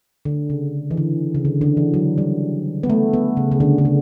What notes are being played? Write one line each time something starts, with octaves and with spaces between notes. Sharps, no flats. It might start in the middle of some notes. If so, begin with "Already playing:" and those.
D3
C#3
E3
D3
C#3
D3
D3
E3
F#3
G3
B3
A3
B3
C#3
C#3
D3
D3
C#3